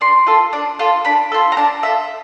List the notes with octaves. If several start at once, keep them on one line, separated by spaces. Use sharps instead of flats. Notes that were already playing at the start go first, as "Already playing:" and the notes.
D4 C6
F4 A4
D4
F4 A4
D4 B5
F4 A4
A#5
D4 A5
F4 A4 E5